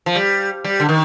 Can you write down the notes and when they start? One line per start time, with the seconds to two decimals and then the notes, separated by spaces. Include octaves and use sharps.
0.06 F3
0.15 G3
0.64 G3
0.80 D3
0.89 D#3